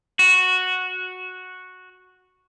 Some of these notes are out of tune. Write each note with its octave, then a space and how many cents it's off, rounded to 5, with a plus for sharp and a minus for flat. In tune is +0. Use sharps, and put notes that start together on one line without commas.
F#4 -5